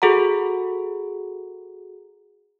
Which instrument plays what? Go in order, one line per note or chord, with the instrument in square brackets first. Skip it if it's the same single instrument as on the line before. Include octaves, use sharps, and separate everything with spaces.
[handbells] F#4 G#4 A4 F#5 A#5